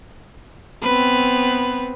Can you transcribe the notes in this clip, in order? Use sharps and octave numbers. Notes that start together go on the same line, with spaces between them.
B3 C4 B4